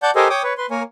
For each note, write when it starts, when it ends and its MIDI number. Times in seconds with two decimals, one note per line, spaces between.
0.03 0.11 74
0.03 0.11 78
0.03 0.11 81
0.03 0.11 91
0.16 0.28 67
0.16 0.28 69
0.16 0.28 70
0.16 0.28 72
0.16 0.28 75
0.16 0.28 80
0.30 0.43 73
0.30 0.43 79
0.30 0.43 86
0.30 0.43 87
0.43 0.53 71
0.43 0.53 73
0.58 0.66 71
0.58 0.66 84
0.71 0.83 58
0.71 0.83 70
0.71 0.83 73
0.71 0.83 80